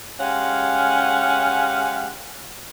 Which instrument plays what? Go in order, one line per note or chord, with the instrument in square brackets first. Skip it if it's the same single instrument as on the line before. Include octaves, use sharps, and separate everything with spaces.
[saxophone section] G#3 C#4 G4 F5 F#5